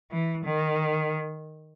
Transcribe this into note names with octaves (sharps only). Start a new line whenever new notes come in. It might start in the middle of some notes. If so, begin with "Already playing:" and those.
E3
D#3